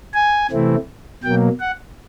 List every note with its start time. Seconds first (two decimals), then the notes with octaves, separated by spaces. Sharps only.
0.14 G#5
0.51 C3 E3 A3 C4 E4
1.23 B2 F#3 A#3 G5
1.60 F#5